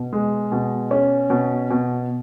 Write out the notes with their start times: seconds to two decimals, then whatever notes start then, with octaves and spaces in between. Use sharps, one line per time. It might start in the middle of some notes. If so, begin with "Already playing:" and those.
Already playing: B2
0.13 G#3
0.52 B2
0.91 C#4
1.30 B2
1.70 B2